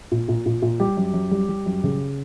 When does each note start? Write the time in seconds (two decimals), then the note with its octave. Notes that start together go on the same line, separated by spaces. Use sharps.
0.12 A#2
0.29 A#2
0.46 A#2
0.62 A#2
0.80 G3 G4
0.97 F#2
1.14 F#2
1.31 G3
1.49 G3
1.66 F#2
1.84 C#3